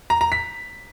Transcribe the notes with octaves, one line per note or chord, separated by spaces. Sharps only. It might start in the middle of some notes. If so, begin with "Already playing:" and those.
A#5
A#5
B6